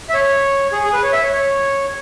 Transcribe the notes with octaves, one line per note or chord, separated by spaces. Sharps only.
E5
C#5
G#4
G#4
B4
C#5
E5
C#5
C#5